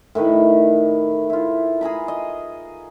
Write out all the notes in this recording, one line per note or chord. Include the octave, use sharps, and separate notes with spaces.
A2 D#3 B4 B5
E4 F4
G#4 G#5 A#5 B5
D#5